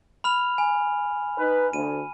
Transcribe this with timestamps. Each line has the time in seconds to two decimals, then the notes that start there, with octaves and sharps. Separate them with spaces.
0.24 B5 F6 F7
0.58 G#5
1.38 D#4 B4
1.73 D2 D#7